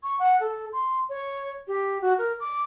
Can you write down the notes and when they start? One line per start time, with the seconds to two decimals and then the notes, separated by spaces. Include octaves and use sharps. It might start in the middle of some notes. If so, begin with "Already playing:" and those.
0.03 C#6
0.19 F#5
0.40 A4
0.73 C6
1.09 C#5
1.68 G4
2.02 F#4
2.18 A#4
2.40 D6